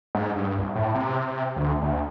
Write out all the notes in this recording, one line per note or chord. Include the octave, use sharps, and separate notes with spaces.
G#2
G2
C2
A2
C3
D2
D2